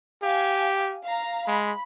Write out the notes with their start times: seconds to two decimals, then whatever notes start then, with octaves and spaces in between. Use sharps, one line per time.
0.23 G4 F5 G#5
1.03 F5 A#5
1.47 G#3 B5